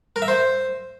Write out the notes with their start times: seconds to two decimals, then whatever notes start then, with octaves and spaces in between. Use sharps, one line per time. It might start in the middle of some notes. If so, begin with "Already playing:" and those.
0.16 A#4
0.22 E5
0.28 C5